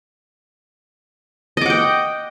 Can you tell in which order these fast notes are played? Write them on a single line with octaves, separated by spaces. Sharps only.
D#5 D6 F#5 G5